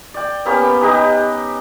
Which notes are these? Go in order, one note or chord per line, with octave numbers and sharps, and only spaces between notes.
D5 G5
A#3 B3 C#4 G4
D#4 G4 B4 D#5